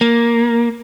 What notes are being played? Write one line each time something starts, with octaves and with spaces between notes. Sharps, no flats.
A#3